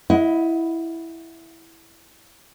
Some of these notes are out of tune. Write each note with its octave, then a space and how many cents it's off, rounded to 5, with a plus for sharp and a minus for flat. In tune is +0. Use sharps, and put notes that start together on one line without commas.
E4 +0 D#5 +20 F#5 -15